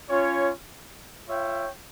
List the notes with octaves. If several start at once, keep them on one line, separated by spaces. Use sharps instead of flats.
C#4 F4 C#5
F4 C#5 E5 G5